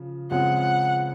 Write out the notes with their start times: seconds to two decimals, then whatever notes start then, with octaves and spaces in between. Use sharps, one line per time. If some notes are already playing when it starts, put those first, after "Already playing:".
Already playing: C#3 F3
0.31 C#2 C#3 F3 G#3 C4 F#5
0.60 F#5